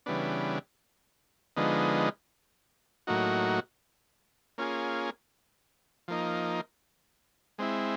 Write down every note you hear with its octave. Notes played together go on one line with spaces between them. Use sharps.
C#3 E3 G3 B3 D4
D3 F3 G#3 B3 D#4
A2 F#3 A#3 D#4 F#4
A#3 C#4 F4 G#4
F3 A#3 D#4
G#3 C4 E4